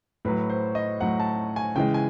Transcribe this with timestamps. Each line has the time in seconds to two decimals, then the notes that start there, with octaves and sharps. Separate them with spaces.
0.25 A2 F#3 B4
0.50 C5
0.75 D#5
1.00 A2 F#3 F#5
1.19 A5
1.56 G#5
1.75 C#3 E3 G#3 G5
1.94 G#5